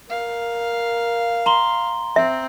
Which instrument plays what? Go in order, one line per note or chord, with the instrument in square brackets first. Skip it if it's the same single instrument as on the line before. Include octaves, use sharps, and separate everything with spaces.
[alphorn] A#4 [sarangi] F5
[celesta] A#5 C6 G7
[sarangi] C4 [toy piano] E5